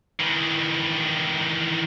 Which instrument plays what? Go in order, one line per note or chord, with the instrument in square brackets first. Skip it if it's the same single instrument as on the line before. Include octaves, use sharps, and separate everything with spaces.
[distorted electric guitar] D#3 E3